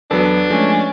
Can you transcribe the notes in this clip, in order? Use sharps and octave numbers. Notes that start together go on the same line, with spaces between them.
E2 F#3 B3 D4 A4 B4
F3 G#3 A3 C#4